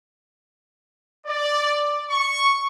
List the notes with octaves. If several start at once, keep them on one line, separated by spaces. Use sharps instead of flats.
D5
C#6